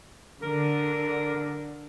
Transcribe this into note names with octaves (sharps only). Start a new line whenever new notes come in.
D3 A#4